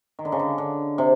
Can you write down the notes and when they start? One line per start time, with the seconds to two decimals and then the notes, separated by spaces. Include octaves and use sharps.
0.19 D#3
0.25 D3
0.32 C#3
0.39 D3
0.58 D3
0.98 C3